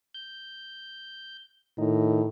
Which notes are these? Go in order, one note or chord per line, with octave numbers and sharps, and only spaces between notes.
G6
A2 D#3 D#4